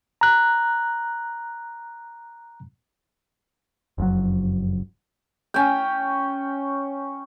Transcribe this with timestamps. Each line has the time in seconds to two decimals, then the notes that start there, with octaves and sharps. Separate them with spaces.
0.21 A#5 F#6
3.98 F#1 F2 C3 F#3
5.54 C#4 G5